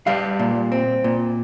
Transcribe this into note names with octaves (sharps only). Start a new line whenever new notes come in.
G3 F5
A#2
C4
A#2